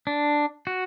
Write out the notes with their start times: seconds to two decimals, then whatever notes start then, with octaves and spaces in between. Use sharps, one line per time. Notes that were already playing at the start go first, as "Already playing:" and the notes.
0.07 D4
0.67 F#4